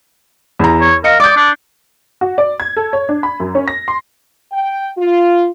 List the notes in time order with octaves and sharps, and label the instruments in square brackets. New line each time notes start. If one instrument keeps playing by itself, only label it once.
[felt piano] E2 A#5
[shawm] C#5
[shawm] A#4 [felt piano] D#5 F5 C#7
[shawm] D5 [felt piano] D6 D#6 G6
[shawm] D4
[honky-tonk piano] F#4
D5
G#6
A4
C#5
D4
B5
F#2
C#4
A#6
C6
[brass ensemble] G5
F4